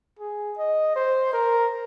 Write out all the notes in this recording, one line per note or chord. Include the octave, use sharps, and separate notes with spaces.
G#4
D#5
C5
A#4